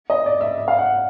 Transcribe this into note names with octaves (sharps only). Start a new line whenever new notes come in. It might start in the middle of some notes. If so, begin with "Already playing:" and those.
D#5
D5
E5
E5
F5
F#5